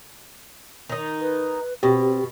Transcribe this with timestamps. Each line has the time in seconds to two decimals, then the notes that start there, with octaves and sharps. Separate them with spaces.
0.89 D#3 D#4
1.21 B4
1.83 B2 C4 G4